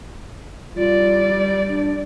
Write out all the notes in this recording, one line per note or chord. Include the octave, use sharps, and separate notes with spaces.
G3 F4 D5
D4